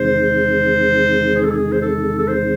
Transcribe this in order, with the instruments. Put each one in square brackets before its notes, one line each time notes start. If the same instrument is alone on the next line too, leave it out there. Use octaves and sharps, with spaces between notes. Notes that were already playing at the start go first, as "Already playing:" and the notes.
Already playing: [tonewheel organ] E2 C3 D#3 G#3 [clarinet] C5
[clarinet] G#4
A4
G#4
C5
A4
A4
C5